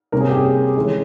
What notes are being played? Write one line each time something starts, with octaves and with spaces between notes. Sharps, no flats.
C3 G3 A#3 C#4 A#4
G#4
G4
G#4
E3 G#3 C#4